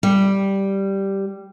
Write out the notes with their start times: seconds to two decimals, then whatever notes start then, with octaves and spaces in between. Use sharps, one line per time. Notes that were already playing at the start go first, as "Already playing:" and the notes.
0.03 G3